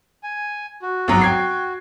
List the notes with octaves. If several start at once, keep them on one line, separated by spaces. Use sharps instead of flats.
G#5
F#4
G#1 F#3
G5 G#6 C7